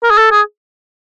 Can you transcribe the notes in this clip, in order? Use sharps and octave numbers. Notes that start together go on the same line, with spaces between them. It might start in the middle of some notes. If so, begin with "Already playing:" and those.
A#4
G#4
A4
G#4